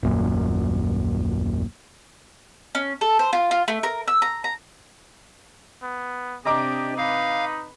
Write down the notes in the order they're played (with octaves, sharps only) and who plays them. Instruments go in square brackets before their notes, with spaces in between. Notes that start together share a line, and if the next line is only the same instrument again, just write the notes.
[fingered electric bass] D#1 A#1 F#2 A#2
[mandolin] C#4
A4
C5
F4
F4
A3
A#4
E6
A#5
A#5
[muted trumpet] B3
[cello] C3 D4 [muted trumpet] G4 [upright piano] D#5 A#5 D6
[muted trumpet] D#4 [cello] B4 [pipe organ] F5